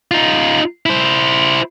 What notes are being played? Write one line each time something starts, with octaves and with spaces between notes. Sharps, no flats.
D#4 F4
E4 C5